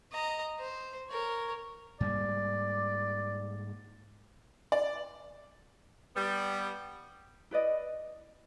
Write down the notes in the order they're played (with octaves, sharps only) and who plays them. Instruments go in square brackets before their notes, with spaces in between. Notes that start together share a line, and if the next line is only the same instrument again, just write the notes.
[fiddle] D#5 A#5
C5
A#4 C#5
[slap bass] G#2 G3 A#3 [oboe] D5
[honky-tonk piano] D5
[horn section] G3 B3
[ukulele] E4 B4 D5 D#5